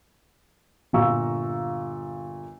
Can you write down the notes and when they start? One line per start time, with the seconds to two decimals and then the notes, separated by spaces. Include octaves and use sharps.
0.93 G1 A#2 F5 A#5 C#6 E6